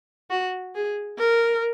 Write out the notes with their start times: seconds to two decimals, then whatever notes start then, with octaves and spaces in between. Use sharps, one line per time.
0.30 F#4
0.75 G#4
1.19 A#4